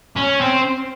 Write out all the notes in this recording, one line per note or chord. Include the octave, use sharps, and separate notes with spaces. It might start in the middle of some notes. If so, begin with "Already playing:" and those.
C#4
C4